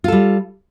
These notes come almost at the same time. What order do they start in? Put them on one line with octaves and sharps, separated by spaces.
F4 A4 G3